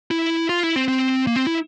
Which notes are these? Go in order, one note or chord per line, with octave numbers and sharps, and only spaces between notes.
E4
F4
E4
C4
C4
A#3
C4
E4